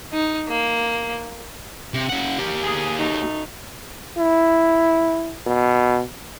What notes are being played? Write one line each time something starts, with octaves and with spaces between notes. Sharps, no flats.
D#4
A#3
C3
C#3 F#5
A#3 G4
G#4
F#2 A3 D#4
E4
B2